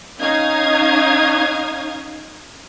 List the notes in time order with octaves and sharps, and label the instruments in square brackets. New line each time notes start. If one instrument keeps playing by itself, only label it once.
[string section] C#4 D#4 F5 D#6 G#6